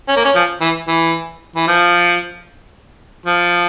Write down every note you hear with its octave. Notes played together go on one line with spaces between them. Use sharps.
C#4
A#3
C#4
F3
E3
E3
E3
F3
F3